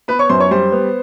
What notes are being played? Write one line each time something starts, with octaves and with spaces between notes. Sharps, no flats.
B3 B4 B5
C#5 C#6
F#2 C5 C6
C#5 C#6
G3 C5 C6
B3